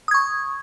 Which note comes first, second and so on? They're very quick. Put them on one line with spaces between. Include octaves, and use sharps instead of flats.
D#6 G#6 C#6